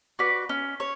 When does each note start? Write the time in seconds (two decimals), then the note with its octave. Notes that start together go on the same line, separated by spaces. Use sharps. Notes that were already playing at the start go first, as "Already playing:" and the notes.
0.19 F#4 B4 D5
0.49 C#4
0.80 C#5